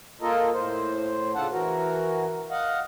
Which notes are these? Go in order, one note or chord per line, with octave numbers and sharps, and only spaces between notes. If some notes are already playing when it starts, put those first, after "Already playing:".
A#3 F4 A4 A#4 D#5
A2 C5
C#3 D4 F4 A4 F#5 A5
E3 F#4 A#4
D#5 F5 F#5